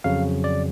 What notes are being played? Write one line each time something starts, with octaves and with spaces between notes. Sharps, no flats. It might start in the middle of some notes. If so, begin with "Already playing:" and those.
F2 C#3 F#3 F5
D5